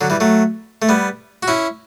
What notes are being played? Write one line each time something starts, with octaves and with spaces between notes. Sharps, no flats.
D3 F#3
E3 G3
F#3 A3
A3
G3 B3
F#4
C#4 E4